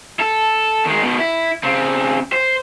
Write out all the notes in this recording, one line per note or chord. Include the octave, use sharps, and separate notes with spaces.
A4
D#3 G#3
B2 D#3
E4
C#3 C4
C5